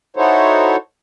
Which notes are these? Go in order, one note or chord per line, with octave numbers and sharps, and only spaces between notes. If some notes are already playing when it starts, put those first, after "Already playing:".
D#4 E4 F#4 A4 C5 C#5